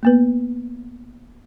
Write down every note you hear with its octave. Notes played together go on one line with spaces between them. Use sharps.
A#3 B3 B4